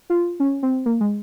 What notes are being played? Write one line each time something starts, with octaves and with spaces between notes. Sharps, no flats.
F4
C#4
C4
A#3
G#3